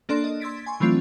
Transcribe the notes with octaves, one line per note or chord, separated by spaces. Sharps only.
A#3 D4 A4 D5 C6 F#6
D#5
C6 E6 G#6 A6 B6 D7
G#5 C6 C#6
E3 F#3 A3 C4 D4 F4